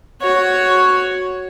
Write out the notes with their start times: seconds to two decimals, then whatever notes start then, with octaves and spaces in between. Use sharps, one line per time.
0.22 F#4 C#5